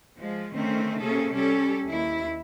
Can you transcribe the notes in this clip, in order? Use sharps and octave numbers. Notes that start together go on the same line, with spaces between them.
F3 G#3
D3 D#3 A3 C4 C#4
C3 A#3 C#4 G#4 A4
G3 C#4 G4 A4
D#2 E4